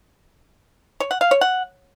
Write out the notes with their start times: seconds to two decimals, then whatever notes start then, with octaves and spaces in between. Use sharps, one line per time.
1.00 C#5
1.11 F#5
1.21 F5
1.31 C#5
1.41 F#5